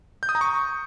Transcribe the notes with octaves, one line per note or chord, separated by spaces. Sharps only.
G6
D#6
A#5
C#6